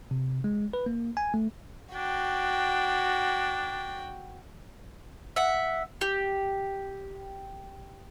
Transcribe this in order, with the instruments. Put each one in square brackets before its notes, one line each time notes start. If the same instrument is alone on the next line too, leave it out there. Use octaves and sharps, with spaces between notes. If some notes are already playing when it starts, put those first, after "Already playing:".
[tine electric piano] C3
G#3
B4
A#3
G#5
A3
[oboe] D4 [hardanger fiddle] F#4 G5
[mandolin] E5 F#5
G4